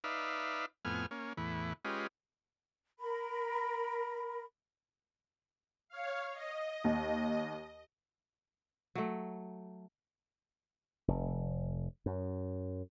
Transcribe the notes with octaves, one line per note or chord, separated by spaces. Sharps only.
D#4 B4 D5 E5 F5
F2 A2 B3 G#5 F6
A#3 C#4
E2 A2 E3 B4
G#3 C#4 F4 G4 B4 D#5
A#4 B5
C#5 F5
D#5
D#2
F#3 A3
F1
F#2